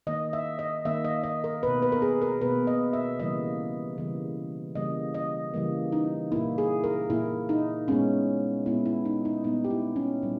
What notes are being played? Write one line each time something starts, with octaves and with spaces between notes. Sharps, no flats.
D#3 A#3 D#5
E5
D#5
D#3 A#3 E5
D#5
D#5
A#4
B2 A#3 B4
B4
A#4
G#4
A#4
B2 A#3 B4
D#5
E5
C#3 E3 G3 A#3 D#5
C#3 E3 G3 A#3
C#3 E3 G3 A#3 D#5
D#5
C#3 E3 G3 A#3
D#4
A#2 A#3 E4
G#4
A#4
A#2 A#3 E4
D#4
A#2 G#3 B3 C#4
A#2 G#3 B3 E4
E4
D#4
D#4
A#2 G3 B3 D#4
G4
E4
C#4
A#2 G3